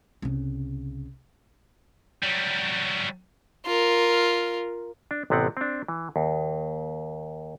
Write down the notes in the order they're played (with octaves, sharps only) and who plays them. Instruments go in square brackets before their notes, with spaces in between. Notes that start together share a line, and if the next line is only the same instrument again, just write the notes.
[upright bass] C2 C#3
[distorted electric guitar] F#3 G3
[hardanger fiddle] F4 A#4
[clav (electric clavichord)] D4
A1 C3 B3 C4 F#5
C4 D4
E3
D#2